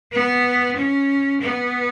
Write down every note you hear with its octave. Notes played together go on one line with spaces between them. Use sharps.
B3
C#4
B3